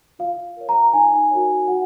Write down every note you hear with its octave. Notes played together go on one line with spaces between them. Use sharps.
F4 F5
A#4 C#5
A#5
D#4 G#5
F#4 A#4 C#5
F#4 F#5